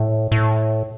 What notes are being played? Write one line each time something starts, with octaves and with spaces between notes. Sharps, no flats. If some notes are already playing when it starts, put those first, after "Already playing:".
Already playing: A2
A2